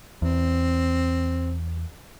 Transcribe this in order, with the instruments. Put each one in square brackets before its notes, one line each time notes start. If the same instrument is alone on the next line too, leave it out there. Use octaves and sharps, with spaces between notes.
[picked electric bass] E2 [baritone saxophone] C4